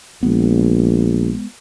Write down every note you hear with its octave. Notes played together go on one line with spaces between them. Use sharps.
A#1 G#3 B3